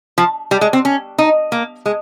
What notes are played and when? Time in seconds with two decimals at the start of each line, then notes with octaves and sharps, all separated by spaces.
0.18 F3
0.51 G3
0.61 G#3
0.73 C4
0.85 C#4
1.18 D#4
1.52 A#3
1.86 G#3